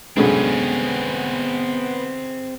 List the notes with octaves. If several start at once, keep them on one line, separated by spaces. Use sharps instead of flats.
C2 F#2 D3 G#3 B3 C4 G#4